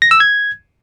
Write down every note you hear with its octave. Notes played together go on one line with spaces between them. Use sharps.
A#6
E6
G#6